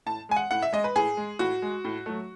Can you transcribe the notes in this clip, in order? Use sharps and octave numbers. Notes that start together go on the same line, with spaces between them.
A2 A5
G#3 G#5
F#5
A2 F#5
E5
G#3 D#5
B4
A2 G#4
G#3
A2 F#4
G#3
A2
F#3 A3